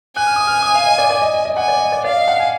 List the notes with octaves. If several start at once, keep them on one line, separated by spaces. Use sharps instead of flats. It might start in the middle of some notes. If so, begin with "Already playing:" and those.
G#5 F#6
F6
D#6
F6
D#6
F5
D#5
D5
D5
D#5
D#5
D#5
F#5 G#5
D5
D#5
D5
D5 F5
D#5
F#5
G#5